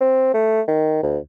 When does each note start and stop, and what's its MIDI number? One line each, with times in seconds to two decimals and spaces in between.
0.01 0.33 60
0.34 0.61 57
0.68 1.03 51
1.03 1.18 38